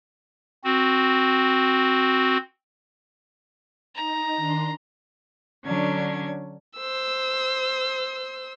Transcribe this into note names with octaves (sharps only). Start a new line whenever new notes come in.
C4 F#4
D#4 A#5
D#3 D4 C6
D3 F#3 C#4 D4 G#6
C5 E6